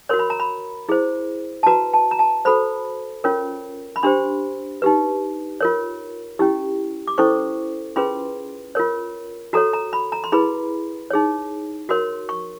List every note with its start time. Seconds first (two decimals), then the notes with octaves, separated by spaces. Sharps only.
0.09 F#4 A#4 C#5 C6
0.19 B5
0.30 A#5
0.40 B5
0.89 E4 G#4 C5
1.63 A5
1.67 F#4 B4 A#5
1.93 A5
2.11 A#5
2.19 A5
2.45 F#4 A4 C5 B5
3.24 C#4 F4 A#4 C#5
3.96 B5
4.03 D4 G4 C5 C6
4.82 D#4 G4 B4
5.61 F4 A#4 C#5
6.39 C#4 E4 G4
7.07 D6
7.18 C#4 E4 A4 C5 C#6
7.96 C#4 F4 G#4 B4 C6
8.75 F4 A#4 C#5
9.53 F#4 A4 C#5 A#5
9.73 A#5
9.93 B5
10.12 A#5
10.24 C6
10.32 E4 G#4 B4 B5
11.11 D#4 G#4 C#5
11.89 F#4 A#4 C#5 C6
12.29 C#6